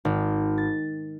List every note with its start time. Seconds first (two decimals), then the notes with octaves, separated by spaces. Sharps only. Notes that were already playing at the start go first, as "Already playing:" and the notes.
0.05 G#1
0.58 A6